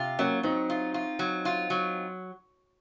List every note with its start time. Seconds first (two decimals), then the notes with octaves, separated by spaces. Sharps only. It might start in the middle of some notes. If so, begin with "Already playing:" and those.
Already playing: C3 F4
0.19 F#3 A#3 C#4
0.43 F#3 C4 D#4
0.70 F4
0.94 F4
1.19 F#3
1.45 F4
1.70 F#3